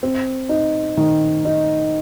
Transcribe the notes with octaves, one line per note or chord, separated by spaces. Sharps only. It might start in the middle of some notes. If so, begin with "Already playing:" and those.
C4
D#4
D#3
D#4